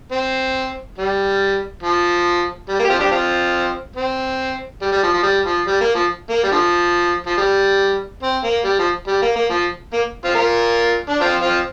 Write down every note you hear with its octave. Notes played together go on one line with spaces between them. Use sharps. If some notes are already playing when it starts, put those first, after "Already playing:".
C4
G3
F3
G3
A#3
G4
C4 F4
D4 G4
C4 F4
C4
G3
G3
F3
F3
G3
F3
G3
A#3
F3
A#3
G3
D3 F3
F3
G3
C4
A#3
G3
F3
G3
A#3
A#3
F3
A#3
C4 F4
F4 A#4
D4
C4 F4
C4 F4